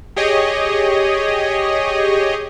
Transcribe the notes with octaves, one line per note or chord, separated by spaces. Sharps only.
G4 G#4 C#5 D#5